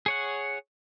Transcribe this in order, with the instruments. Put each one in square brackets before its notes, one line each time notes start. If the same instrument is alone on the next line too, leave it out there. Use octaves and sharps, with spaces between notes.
[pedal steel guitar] G#4 C#5 F#5